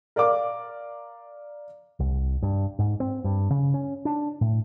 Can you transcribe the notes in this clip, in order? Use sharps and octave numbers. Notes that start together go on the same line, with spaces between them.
A#4 D5 F5 D6
C2
G2
G#2
C4
G2
C#3
C#4
D4
A2